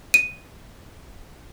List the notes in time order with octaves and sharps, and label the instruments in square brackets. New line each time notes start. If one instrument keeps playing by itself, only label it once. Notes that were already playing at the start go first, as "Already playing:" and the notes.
[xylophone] D#7